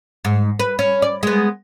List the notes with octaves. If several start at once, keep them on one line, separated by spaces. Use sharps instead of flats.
G#2
B4
C#4
D5
G#3 B3